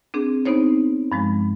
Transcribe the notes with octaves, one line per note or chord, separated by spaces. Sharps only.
C4 D4 G#4
B3 C4 D#4 C5 C#5
G2 F3 G#3